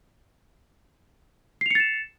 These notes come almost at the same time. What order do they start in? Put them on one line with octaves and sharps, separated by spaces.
C7 F7 C#7 A6 E7